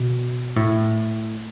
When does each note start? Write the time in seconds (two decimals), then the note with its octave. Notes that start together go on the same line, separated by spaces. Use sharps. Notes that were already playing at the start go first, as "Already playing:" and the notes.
Already playing: B2
0.56 A2